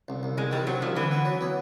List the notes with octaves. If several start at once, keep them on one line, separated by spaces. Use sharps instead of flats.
C2
C2
C2 G#3
D#3 G3
C3 F#3
C2 F3
D3 E3
B3
F#3
B3